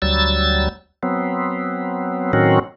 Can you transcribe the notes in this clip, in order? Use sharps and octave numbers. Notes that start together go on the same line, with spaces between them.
D2 F#3 G3 E6 A6
F#3 B3 C4
A2 D#3 F#3 C4 C#4 F#4